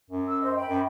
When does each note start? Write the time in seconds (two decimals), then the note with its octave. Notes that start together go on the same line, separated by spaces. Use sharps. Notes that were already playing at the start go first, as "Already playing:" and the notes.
0.10 F#2
0.27 E6
0.41 C5 D#5
0.57 G5 B5
0.69 F#2